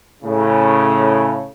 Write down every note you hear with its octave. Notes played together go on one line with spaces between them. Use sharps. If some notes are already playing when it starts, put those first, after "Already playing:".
A2 C#3